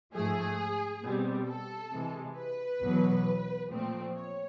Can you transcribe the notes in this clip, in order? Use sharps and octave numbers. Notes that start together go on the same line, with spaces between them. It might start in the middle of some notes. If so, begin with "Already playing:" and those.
G#2 F3 A3 G#4
B2 G3 C4
A4
C3 E3 G#3
B4
E2 B2 F#3
A#2 F3 A3 C4
C#5